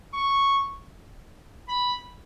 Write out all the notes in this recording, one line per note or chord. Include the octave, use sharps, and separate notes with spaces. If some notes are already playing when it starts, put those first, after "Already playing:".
C#6
B5